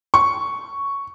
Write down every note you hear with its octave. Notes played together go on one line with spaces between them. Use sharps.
C#6